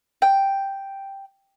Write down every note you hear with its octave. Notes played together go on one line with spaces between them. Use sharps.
G5